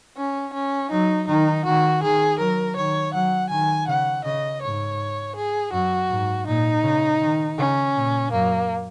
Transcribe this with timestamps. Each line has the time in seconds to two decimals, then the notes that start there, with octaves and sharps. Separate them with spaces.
0.17 C#4
0.54 C#4
0.91 F#3 D#4
1.28 D#3 D#4
1.66 D#3 F#4
2.02 D#3 G#4
2.39 F#3 A#4
2.76 D#3 C#5
3.13 F#3 F#5
3.50 D#3 G#5
3.88 C#3 F#5
4.25 C#3 D#5
4.62 G#2 C#5
5.36 G#4
5.72 F#2 F#4
6.10 G#2
6.47 A#2 D#4
6.83 C#3
7.21 D#3
7.58 C#3 C#4
7.95 A#2
8.32 F#2 A#3